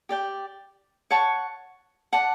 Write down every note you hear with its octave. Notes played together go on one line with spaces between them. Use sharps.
G4 D5 G5
C#5 F#5 A5 C#6
D5 F#5 A5